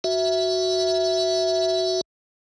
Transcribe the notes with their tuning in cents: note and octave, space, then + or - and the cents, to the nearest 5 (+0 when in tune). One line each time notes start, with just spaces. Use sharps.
F#4 +0 E5 +0